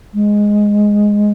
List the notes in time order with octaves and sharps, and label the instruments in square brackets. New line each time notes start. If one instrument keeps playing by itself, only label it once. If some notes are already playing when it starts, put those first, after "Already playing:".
[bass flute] G#3